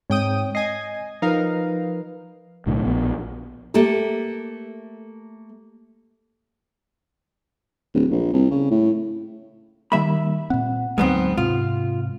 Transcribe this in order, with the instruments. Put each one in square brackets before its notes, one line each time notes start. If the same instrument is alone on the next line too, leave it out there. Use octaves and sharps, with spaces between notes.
[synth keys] G#2 G5 D#6 [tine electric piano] G#3 C4 C#5
[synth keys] D#5 G#5 [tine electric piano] C7
[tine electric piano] F3 B4 [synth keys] D#4 A#4 F5
[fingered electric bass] B1 A2 D3
A#1 B3
[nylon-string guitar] A3 A#3 G4 A4
[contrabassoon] D1
A#1
C2
C#3
A2
[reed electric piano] D#3 G3 A#3 [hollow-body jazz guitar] E5 B5
[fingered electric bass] A#2 C4 [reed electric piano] F#5
[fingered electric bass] D2 F#3 G#3 [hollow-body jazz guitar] G#2 B3 C4
[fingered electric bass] G#2 C3 [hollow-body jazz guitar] F4